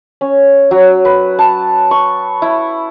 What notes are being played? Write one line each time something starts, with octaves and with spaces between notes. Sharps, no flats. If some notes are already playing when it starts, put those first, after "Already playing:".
C#4
F#3
B4
A5
C#6
E4